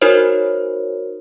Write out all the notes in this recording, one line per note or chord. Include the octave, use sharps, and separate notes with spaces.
D#4 F#4 A#4 C5 C#5